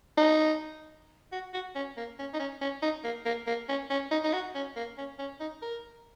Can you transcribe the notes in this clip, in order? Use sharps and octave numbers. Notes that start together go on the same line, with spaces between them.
D#4
F#4
F#4
C#4
A#3
C#4
D#4
C#4
C#4
D#4
A#3
A#3
A#3
C#4
C#4
D#4
D#4
F#4
C#4
A#3
C#4
C#4
D#4
A#4